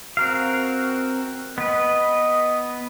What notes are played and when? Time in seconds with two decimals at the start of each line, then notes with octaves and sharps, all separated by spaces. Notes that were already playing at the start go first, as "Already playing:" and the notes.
0.17 C4 F#4 A#4 F5
1.58 B3 B4 D#5